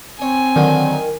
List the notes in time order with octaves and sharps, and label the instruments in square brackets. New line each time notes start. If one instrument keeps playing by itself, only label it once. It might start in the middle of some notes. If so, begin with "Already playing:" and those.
[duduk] C4 [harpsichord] C#5 [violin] G#5
[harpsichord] D3 F#3 [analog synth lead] D#3